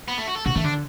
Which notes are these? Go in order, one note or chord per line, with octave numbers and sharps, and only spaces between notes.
B3
A3
F#4
A4
B2 F#4
E3 A3
D3 D4